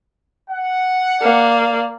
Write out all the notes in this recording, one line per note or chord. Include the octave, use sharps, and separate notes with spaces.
F#5
A#3 D5